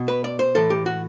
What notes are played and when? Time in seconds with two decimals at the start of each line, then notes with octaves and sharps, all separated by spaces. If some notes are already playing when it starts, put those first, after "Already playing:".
Already playing: B2
0.08 B4
0.24 D5
0.39 C5
0.55 A2 E3 A4
0.70 G4
0.86 F#4